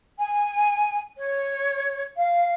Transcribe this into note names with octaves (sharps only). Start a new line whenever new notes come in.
G#5
C#5
F5